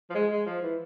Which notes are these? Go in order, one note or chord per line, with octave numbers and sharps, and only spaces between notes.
F3
G#3
G#3
F3
E3